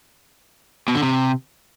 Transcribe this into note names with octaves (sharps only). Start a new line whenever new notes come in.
B2
D3
C3